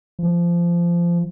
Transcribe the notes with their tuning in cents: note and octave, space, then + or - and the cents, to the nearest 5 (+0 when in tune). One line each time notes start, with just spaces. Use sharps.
F3 -20